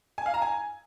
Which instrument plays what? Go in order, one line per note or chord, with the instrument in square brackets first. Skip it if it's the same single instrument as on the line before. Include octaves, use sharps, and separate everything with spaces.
[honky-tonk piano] G#5
F5
A#5
G#5